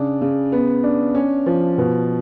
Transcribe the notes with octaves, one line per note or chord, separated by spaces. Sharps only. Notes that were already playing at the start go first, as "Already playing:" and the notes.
Already playing: C#3 D4
C#3
B3
D4
C#4
F3
B2